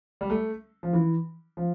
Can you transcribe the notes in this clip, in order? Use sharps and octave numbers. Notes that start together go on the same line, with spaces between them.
G3
A3
F3
E3
F3